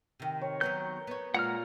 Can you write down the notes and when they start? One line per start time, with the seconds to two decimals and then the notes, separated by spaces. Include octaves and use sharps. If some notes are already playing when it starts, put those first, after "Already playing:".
0.20 C3 D#3
0.41 C#5
0.61 D#3 F#3 B3 A#4 G6
1.07 B3 C#5
1.34 A#2 G#3 F#5 A#5 F6